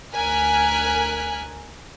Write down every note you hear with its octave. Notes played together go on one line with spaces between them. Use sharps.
D2 A#4 G#5 F6 F#6 B6